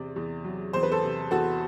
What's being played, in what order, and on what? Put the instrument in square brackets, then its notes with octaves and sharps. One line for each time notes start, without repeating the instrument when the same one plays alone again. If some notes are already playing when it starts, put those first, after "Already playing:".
Already playing: [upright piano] E2 C3 D5
E2
F#3
E2 C5
B4
A4 C5
C3
E2 F#4 A4